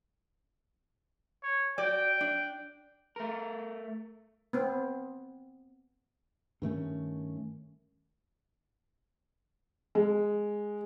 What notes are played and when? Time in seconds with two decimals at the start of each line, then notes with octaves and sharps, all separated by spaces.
1.43 C#5
1.78 F#4 D5 G5
2.21 D4
3.16 A3 A#4
4.53 B3 C4
6.62 G2 D#3 A3 C#4
9.95 G#3